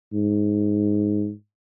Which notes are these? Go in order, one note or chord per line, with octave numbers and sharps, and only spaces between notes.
G#2